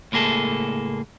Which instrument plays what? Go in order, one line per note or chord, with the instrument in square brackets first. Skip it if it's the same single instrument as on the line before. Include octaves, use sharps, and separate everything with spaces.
[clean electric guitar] C#2 A2 A#3 G#4 A4